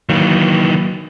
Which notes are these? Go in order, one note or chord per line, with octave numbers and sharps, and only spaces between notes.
D#3 E3 F#3 A#3